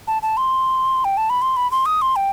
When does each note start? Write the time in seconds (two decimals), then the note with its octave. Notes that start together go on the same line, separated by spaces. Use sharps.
0.07 A5
0.22 A5
0.37 C6
1.05 G5
1.17 A5
1.30 B5
1.42 C6
1.57 B5
1.72 C6
1.86 D#6
2.02 C6
2.16 G5